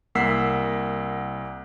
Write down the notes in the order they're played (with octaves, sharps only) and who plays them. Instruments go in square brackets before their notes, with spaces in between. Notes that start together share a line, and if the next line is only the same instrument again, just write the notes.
[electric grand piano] C2 A#3 F#5 E6 B6 C7